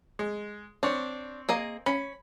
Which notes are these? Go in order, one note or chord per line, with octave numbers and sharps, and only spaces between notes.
G#3
C4 D4 C#5
A#3 G#4 D#5
C#4 B5